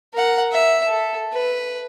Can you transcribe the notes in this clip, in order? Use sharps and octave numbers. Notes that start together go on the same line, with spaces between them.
A#4 F#5
E5
A4
B4